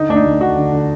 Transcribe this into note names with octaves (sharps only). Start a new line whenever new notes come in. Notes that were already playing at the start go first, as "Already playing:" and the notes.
Already playing: D3 D#4
D2 D4
D#4
D2
D3 F#4
D3
D3